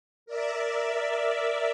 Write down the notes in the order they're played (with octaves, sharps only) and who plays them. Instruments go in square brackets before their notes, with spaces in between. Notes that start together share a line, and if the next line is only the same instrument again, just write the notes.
[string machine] A#4 D5 E5